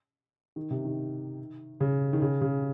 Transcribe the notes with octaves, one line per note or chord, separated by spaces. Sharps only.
D#3
C3
D#3
C#3
D#3
C#3
C#3